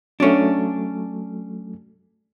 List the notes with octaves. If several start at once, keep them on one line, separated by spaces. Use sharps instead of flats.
F#3 A3 C#4 D4